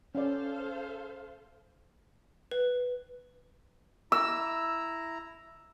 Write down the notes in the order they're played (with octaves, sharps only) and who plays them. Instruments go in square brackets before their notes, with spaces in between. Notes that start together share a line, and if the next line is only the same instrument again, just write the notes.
[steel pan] C#4 D5 [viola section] A4 C5 F5
[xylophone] B4
[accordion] E4 A#5 [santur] E6